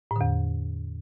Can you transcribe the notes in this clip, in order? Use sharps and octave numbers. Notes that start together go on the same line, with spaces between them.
E2 A2 D3